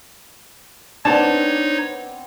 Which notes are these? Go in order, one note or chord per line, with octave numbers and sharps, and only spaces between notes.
B3 C4 D4 D#4 C#5 D5 A5